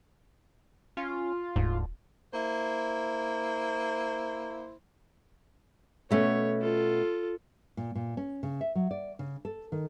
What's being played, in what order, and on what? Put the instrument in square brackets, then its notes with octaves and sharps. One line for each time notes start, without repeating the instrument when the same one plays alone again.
[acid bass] C#4 [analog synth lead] F4
[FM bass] D#1 [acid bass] D2 [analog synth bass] G#2
[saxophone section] A#3 E4 C5
[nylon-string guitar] B2 A3 C#4 [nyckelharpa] C#5
[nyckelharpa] F4 A4
[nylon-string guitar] A#2
A#2
C#4
C#3
E5
F#3
D5
C#3
A4
D#3